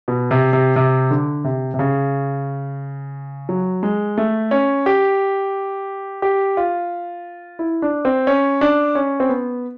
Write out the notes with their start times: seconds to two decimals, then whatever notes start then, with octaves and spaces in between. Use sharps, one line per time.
0.08 B2
0.31 C3
0.53 C3
0.76 C3
1.11 D3
1.44 C3
1.74 C3
1.79 C#3
3.49 F#3
3.83 G#3
4.18 A3
4.51 C#4
4.86 G4
6.22 G4
6.57 F4
7.59 E4
7.82 D4
8.05 C4
8.27 C#4
8.61 D4
8.95 C#4
9.20 C4
9.29 B3